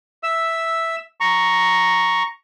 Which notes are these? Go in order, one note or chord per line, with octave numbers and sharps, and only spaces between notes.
E5 E6
A#5 C#6